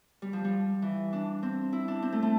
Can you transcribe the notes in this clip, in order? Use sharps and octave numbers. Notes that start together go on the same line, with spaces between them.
G3
F3
G3
E3
D4
C4
E4
D4
C4
A3
A3